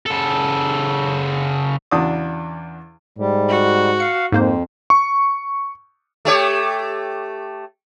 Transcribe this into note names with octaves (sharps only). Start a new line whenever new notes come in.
C#3 A4
E2 C#3 D4 F#4 D6 D#6
G#2 G3
F#4
F5 C#7
F2 G#2 A#3 C5
C#6
A3 G4 C#5